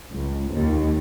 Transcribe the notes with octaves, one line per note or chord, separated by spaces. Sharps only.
C#2
D#2